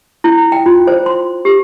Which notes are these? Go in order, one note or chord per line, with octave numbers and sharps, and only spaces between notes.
E4
G5
F4
C5
C6
G4